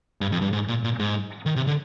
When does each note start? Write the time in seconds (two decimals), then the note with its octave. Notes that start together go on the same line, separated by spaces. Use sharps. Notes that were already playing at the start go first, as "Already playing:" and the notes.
0.21 G2
0.32 F2
0.42 G2
0.53 G#2
0.68 A#2
0.84 A#2
0.99 G#2
1.46 D#3
1.56 C3
1.67 D3